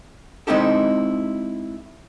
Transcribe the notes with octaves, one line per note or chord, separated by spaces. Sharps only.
G#3 C4 D#4 E4 G4 A4